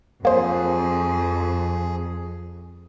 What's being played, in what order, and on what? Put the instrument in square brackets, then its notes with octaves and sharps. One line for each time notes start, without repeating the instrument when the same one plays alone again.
[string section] F2 [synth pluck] A#3 C5 [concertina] G#4